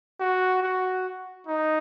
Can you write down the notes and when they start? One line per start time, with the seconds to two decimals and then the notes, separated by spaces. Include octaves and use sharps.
0.20 F#4
0.62 F#4
1.47 D#4